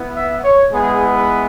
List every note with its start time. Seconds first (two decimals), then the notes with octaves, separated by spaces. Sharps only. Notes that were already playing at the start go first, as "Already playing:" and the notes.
Already playing: B3 E4
0.16 E5
0.44 C#5
0.73 G#3 B3 E4 G#4
1.15 B4